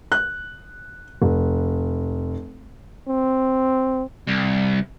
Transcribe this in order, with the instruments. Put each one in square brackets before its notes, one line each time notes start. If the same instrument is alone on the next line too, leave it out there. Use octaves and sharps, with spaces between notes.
[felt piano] F#6
F1
[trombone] C4
[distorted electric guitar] C2